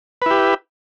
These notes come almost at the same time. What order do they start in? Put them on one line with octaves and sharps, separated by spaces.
B4 E4 G4